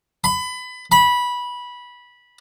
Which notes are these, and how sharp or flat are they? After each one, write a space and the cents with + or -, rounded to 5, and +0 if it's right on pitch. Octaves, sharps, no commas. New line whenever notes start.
B5 +25
B5 -15